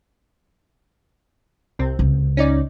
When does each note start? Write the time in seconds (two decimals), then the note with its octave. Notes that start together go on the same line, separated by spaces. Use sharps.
1.79 C2 C3 C4
1.99 C#2
2.37 C#4 D#4 D5